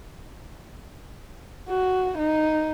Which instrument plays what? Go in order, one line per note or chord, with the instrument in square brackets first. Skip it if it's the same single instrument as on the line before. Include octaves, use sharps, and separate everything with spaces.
[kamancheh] F#4
D#4